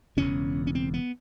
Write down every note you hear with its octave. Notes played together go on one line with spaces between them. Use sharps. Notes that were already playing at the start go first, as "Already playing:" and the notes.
E1 E2 C#3 C#4
C#4
C4
B3